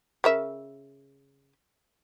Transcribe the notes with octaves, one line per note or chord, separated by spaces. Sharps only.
C#3 A#4 E5